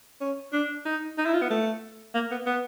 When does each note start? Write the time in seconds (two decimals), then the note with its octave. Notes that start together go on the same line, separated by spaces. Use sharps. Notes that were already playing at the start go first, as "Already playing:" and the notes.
0.21 C#4
0.53 D4
0.86 D#4
1.18 D#4
1.26 E4
1.34 F4
1.42 B3
1.50 A3
2.14 A#3
2.31 B3
2.46 B3